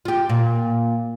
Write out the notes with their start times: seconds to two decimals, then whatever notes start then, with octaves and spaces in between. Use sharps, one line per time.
0.05 F4 G4
0.29 A#2